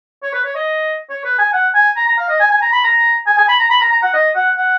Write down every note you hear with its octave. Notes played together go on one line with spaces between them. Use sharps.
C#5
B4
C#5
D#5
C#5
B4
G#5
F#5
G#5
A#5
A#5
F5
D#5
G#5
G#5
A#5
B5
A#5
G#5
G#5
B5
A#5
B5
A#5
A#5
F#5
D#5
F#5
F#5